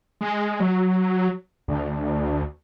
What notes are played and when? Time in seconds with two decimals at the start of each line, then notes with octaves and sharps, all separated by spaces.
0.21 G#3
0.60 F#3
1.68 D2